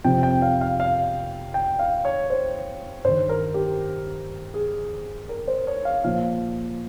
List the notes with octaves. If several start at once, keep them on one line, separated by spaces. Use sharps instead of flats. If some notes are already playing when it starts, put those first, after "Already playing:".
F2 C3 F3 G5
G5
F5
F5
F5
G5
F5
C#5
C5
G2 D#3 C5
A#4
G4
G#4
A#4
C5
C#5
F5
A#2 F3 F5